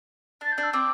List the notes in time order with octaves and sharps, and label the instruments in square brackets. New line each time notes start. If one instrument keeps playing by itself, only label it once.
[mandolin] D4 [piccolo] A6
[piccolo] G6
[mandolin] D4
[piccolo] E6
[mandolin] C4 [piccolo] D6